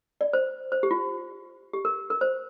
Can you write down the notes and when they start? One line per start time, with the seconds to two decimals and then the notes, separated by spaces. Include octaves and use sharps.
0.21 D5
0.33 C5
0.72 C5
0.83 G4
0.91 F4
1.73 G4
1.85 A#4
2.10 A#4
2.21 C5